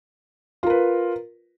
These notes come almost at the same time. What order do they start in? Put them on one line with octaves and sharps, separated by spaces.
F4 A#4 B4